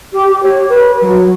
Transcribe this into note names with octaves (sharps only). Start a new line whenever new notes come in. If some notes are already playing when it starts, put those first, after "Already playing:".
G4
G4
C#5
B4
F#3